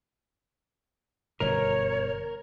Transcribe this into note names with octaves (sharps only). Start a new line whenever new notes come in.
G1 F#2 B2 A#4 C#5